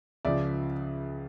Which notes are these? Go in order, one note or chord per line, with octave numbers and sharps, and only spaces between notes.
C#2 C#3 F3 D5 E5